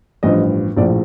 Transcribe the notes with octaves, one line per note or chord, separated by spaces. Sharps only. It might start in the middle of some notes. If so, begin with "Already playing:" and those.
A1 G2 F3 D#5
A#1 A2 F3 D5